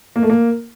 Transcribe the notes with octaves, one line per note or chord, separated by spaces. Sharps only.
A#3
A3
A#3